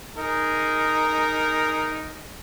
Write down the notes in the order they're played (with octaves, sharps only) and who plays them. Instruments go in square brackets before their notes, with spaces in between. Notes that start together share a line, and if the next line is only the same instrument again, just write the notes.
[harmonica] D#4 G#4 A#4